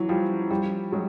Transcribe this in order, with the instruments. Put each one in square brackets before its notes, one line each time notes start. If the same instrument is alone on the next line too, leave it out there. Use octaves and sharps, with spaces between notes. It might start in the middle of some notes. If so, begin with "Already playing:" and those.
Already playing: [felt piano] E3 F#3
F3 G3
F3 G3
F#3 G#3